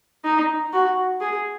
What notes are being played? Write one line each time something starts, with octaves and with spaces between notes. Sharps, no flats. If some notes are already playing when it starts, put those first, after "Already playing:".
D#4
F#4
G#4